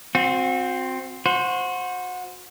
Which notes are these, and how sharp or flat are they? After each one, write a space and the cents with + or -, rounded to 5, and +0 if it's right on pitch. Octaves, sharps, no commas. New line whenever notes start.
C4 +0 F#4 -40
F#4 -25 C5 +0